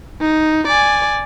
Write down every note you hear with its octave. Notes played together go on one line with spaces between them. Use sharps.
D#4
D5 G#5